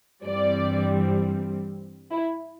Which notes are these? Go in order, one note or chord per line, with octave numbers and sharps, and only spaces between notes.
G2 E3 G3 C4 D5
E4